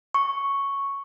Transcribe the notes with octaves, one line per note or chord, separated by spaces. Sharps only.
C#6